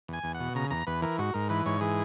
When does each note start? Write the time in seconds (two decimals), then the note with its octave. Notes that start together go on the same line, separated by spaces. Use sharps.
0.08 E2 G#5
0.23 E2
0.34 F#5
0.40 B2
0.55 C#3 A#5
0.71 E2 A#5
0.87 E2 B4
1.02 E3 A#4
1.18 G#2 F#4
1.34 G#2 A#4
1.49 E3 B4
1.66 G#2 C#5
1.81 E3 G#4